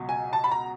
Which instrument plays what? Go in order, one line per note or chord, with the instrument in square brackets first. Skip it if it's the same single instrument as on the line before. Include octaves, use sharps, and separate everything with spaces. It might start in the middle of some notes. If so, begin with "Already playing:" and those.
Already playing: [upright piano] C#2 B2 F#3
G#5
A5
B5
A#5